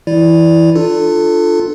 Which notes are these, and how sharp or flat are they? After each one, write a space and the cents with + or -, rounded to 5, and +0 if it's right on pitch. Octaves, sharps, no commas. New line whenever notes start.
E3 +0 E4 +0 D5 -5
D4 +30 F4 +0 A4 +0